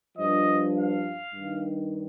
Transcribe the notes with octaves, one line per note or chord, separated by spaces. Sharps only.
G2 F3 D#5
F5
G2 D#3